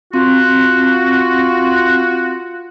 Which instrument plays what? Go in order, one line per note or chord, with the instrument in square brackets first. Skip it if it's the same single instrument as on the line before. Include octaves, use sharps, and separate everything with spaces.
[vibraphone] C4 [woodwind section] F4 F#4